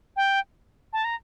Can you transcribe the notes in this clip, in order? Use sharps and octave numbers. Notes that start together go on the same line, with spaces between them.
G5
A5
A#5